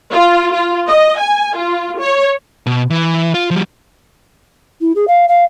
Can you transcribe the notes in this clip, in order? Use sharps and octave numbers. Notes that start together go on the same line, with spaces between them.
F4
F4
D#5
G#5
F4
C#5
B2
E3
F4
F3 G3
E4
G#4
F5
F5